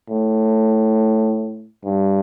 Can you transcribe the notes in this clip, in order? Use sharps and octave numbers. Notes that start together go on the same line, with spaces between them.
A2
G2